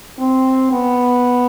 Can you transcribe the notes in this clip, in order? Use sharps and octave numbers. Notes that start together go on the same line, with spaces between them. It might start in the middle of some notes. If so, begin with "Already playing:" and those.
C4
B3